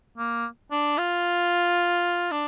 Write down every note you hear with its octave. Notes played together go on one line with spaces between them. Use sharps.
A#3
D4
F4
D4